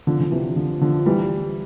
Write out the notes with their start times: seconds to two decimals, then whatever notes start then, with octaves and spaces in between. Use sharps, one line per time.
0.07 D3 F3
0.20 D3
0.31 C3 E3
0.56 D3 F3
0.81 D3 F3
1.06 E3 G3